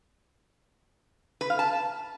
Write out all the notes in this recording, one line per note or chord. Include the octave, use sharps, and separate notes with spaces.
B4
F5
A5